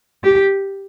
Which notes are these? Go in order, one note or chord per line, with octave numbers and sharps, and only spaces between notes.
G4